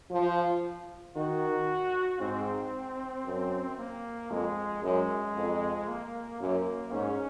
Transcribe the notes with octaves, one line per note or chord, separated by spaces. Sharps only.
F3
D#3 F#4
G#2 C4
F#2
A#3
F2 G#3
F#2 G#3
F2
A#3
F#2 A#3
G#2 C#4